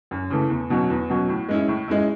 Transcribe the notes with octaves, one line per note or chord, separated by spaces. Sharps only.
F#2
C#3 E3 A3
E2
B2 F#3 C#4
E2
B2 F#3 C#4
A2
G#3 C#4 E4
A2
G#3 C#4 E4